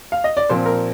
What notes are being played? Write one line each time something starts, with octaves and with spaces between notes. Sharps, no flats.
F5
D#5
D5
A#2 F3 C4 C5
A#4